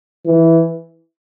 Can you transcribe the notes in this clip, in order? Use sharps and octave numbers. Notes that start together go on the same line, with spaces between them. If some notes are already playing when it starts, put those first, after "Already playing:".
E3